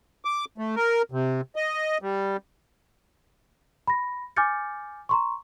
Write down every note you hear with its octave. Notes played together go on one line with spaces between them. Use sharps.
D6
A3
A#4
C3
D#5
G3
B5 A#6
G#5 D6 F6 G6 A6 C#7
A#5 C6 C#6